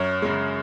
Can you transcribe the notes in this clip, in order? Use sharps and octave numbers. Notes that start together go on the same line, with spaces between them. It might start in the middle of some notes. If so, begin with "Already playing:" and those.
Already playing: F#2 C#5
C#3 G#3